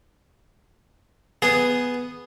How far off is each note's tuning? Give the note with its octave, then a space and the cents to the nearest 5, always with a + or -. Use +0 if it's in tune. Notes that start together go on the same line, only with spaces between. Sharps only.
B3 +0 G#4 +0